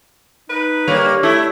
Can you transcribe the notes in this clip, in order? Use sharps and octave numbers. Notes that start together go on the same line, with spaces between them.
D#4 B4
D3 G3 A#3 C#5
A3 E4